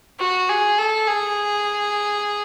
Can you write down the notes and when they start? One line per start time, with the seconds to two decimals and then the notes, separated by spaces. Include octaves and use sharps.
0.20 F#4
0.49 G#4
0.78 A4
1.08 G#4